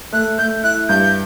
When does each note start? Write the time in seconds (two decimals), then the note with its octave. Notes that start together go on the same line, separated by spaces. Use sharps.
0.13 A3 F#6
0.38 A3 G6
0.64 E4 F#6
0.89 G2 G6